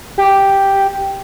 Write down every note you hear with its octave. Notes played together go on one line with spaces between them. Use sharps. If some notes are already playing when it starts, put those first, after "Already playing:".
G4